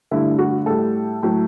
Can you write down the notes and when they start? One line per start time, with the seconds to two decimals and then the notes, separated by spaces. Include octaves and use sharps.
0.11 G2 D3 A3 E4
0.39 F#4
0.66 A2 G3 A4
1.23 A2 F#3 A3